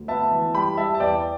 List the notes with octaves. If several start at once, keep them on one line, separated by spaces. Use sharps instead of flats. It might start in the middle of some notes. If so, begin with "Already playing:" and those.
Already playing: D2
B3 E5 A5
E3
G3 G5 B5
G3 E5 A5
A5
E2 D5 G5